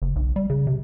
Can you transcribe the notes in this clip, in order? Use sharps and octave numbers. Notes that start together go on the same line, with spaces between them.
F#1
B1
G3
C#3
C3